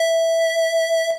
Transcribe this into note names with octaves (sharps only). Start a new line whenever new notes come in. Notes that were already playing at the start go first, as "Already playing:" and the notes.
Already playing: E5